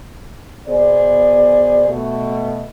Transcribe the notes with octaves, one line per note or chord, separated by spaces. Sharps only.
B2 B3 G#4 C5 D5
B2 A3